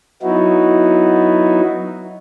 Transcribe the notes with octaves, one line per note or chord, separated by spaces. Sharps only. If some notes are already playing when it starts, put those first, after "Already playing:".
F#3 B3 D#4 E4 F#4